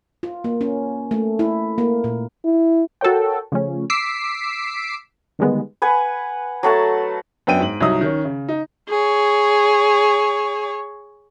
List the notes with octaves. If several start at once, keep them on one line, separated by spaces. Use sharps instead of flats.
F4
A#3
C#4
A3
E4
A#3
A#2
E4
F#4 A4 A#4 C#5 G5
C#3 F3 A3 C#4
D6 E6 B6 C7 D7 E7
D3 D#3 G3 G#3 B3
B4 F#5 G#5
F#3 A3 F#5 A5
F#2 B3 D4 G5 D7 D#7
G#2 F#7
C2 F#3 D#4 D#5 D#6
D#3 C#4
C#3
D#4
G#4 C#5